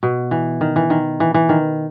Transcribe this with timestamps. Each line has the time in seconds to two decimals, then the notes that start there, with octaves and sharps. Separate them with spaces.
0.03 B2
0.31 E3
0.61 D#3
0.76 E3
0.90 D#3
1.20 E3
1.34 E3
1.49 D#3